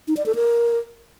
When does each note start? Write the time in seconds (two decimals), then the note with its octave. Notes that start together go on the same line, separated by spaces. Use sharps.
0.08 D#4
0.17 D5
0.26 A4
0.35 A#4